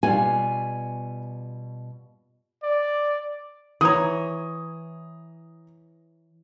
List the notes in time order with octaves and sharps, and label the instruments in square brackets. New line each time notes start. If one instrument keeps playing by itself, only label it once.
[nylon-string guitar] B2 G3 F4 [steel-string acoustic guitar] G#5
[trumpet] D5
[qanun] E3 C#5 [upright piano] A#5 D#6